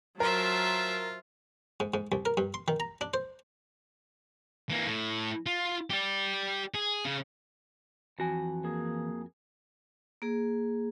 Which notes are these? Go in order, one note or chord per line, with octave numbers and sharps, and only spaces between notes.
F#3 F4 A#4 C5 E5 A5
G#2
G#2
C2
A#4
G2
C6
D#3
A#5
D4
C5
E3 A#3
A2
F4
G4 D5
G#4
C#3
F2 E3 F#4 G#5
A#3 G#4
A#3 G#4